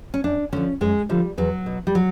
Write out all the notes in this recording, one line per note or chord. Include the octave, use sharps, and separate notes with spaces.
C#4
F#2 D4
D3 F3 C#4
F#2 G#3
D3 F3 G3
E2 F#3
B2
G3
F#3